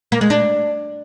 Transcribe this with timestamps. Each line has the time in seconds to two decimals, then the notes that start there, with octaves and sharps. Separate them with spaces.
0.12 A#3
0.21 G#3
0.30 D4